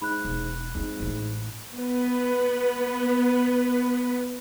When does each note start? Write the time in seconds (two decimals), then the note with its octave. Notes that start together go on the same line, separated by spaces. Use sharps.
0.02 G#2 B5 F#6
0.25 E1
0.75 F2 G#2
1.00 A1 A2
1.76 B3 B4